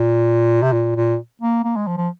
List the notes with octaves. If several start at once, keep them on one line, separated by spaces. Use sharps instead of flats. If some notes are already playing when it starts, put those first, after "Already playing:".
Already playing: A#2
C3
A#2
A#2
A#3
A#3
G#3
F3
F3